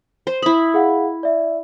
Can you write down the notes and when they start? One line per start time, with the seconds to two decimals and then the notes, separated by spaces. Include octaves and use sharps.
0.27 C5
0.42 E4 B5 D#6
0.74 G#4 F5 F#5
1.23 D5 E5